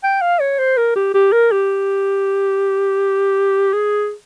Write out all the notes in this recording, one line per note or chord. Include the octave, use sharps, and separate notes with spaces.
G5
F5
C#5
C5
A#4
G4
G4
A#4
G4
G#4